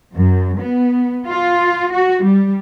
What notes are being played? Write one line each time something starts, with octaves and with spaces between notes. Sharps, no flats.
F#2
B3
F4
F#4
G3